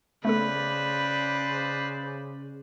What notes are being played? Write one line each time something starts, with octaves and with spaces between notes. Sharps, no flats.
C#3 A3 B3 A4 B4 C5 D5